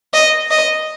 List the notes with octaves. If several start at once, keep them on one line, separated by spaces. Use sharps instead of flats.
D#5
D#5